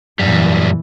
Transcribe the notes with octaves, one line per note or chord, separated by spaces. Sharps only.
F#2 A#2 E3 G3